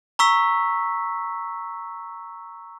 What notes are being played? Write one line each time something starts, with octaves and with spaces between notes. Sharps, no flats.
A#5 C#6 E6 B6